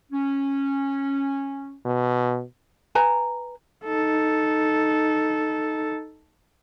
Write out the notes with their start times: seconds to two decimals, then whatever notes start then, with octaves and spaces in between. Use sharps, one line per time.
0.12 C#4
1.86 B2
2.95 B4 G#5 A#5
3.85 D#4 A4